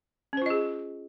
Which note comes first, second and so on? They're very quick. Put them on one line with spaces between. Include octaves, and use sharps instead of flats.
C#4 C5 F4 D#5 G#4